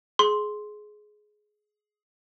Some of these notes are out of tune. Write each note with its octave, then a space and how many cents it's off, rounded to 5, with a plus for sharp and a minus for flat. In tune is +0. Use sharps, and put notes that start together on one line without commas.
G#4 +15 C6 +0